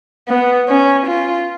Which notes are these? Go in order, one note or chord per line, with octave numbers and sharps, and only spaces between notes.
B3
C#4
F4